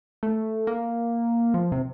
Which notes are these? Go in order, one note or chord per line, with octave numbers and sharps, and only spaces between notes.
A3
A#3
F3
C3